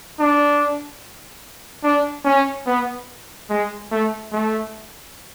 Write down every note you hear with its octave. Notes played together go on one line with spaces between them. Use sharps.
D4
D4
C#4
B3
G#3
A3
A3